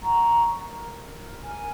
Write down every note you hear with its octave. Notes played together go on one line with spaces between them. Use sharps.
F#5 A#5 C#6
A#4
A#4 G#5 F6